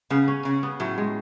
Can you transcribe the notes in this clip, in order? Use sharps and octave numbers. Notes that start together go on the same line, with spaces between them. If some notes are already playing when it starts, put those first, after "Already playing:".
C#3 B3
C#4
C#3
B3
A2 F#3
G#3